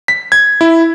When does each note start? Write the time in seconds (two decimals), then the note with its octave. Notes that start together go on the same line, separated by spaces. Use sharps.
0.08 B6
0.32 G#6
0.61 E4